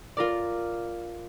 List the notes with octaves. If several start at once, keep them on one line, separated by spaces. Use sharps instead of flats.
F4 A#4 D5